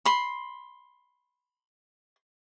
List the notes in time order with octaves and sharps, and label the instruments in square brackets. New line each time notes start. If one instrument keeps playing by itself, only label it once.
[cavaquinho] B5 C6